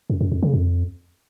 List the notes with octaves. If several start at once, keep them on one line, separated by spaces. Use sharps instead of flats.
F#2
F#2
F2
C#3
F2